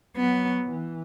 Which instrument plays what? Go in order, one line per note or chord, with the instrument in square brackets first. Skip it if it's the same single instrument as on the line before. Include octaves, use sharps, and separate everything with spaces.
[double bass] F#3 [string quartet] B3
[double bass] E3